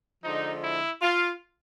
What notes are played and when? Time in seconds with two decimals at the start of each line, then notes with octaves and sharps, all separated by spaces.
0.24 D3 F3 G#3 D#4
0.64 E4
1.02 F4